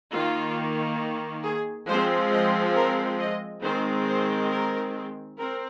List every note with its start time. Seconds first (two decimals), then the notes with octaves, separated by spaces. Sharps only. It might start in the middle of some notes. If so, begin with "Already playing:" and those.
0.12 D#3 A#3 F4
1.44 G#4
1.87 F3 G#3 C4 C5
2.31 D#5
2.75 A#4
3.19 D#5
3.63 D#3 G#3 C4 C5
4.07 C5
4.51 A#4
5.39 C4 A#4